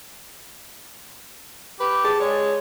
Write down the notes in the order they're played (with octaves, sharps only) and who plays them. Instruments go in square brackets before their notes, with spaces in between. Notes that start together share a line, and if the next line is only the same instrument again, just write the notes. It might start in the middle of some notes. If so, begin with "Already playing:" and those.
[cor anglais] G4 [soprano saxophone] B4
[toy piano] G#4 [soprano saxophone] A5
[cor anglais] G#3 [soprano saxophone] C#5 [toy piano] D5